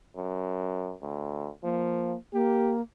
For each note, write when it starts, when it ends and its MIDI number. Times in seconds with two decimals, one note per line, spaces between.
0.16 0.93 42
1.02 1.49 38
1.63 2.13 53
1.63 2.17 58
2.33 2.81 58
2.33 2.74 67